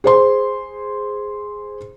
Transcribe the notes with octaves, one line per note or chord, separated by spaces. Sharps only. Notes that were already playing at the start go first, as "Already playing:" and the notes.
G#4 C5 C6